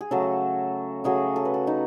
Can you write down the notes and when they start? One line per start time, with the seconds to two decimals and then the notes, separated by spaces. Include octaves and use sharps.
0.01 G#4
0.11 C#3 F#3 A3 A4
1.04 C#3 F#3 A3 G#4
1.36 A4
1.45 B4
1.54 A4
1.67 D#4